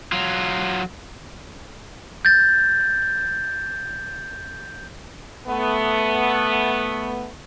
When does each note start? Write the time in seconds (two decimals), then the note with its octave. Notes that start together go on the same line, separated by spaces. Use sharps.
0.12 F#3 F4
2.25 G6 A6
5.48 A3 B3